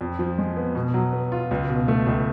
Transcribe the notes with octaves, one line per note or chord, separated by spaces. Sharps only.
F2
F3
G#3
B3
B2
F#3
B3
F4
C#2
B2
A3
C#2